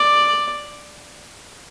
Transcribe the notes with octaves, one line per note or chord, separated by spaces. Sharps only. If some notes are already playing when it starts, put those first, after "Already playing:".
Already playing: D5